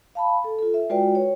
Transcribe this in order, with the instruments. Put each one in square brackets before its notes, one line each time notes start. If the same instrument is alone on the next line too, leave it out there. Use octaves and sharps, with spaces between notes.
[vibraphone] F5 A5 B5
A4
F4 A4
E5
G#3 F4 F#4 B4 D5 G5
C#5